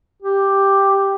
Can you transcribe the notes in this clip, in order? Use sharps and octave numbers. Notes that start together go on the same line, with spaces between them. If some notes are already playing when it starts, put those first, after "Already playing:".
G4